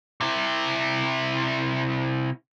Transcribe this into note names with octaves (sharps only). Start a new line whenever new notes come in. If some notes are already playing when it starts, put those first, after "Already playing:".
C3 E4